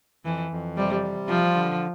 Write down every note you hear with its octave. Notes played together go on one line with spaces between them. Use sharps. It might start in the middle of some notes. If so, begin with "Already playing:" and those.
F2 E3
F2
C3 G3
G3
F3 F4
D3